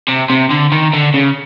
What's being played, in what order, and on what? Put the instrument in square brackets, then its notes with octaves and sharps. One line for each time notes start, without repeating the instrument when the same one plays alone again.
[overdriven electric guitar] C3
C3
D3
D#3
D3
C#3